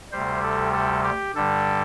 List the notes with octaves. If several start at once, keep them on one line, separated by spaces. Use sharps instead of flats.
D2 C3 G3 C5
A4
A4
G4
G2 D3 G3 A4